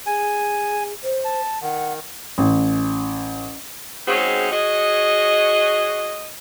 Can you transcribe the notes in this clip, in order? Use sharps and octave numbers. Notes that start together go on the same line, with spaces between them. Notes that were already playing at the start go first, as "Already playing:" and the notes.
G#4 G#5
C5
A5
D#3 F#5
A1
G#3 C4 C#4 D#4 F#4 G#4
F#4 G#4 C#5 D#5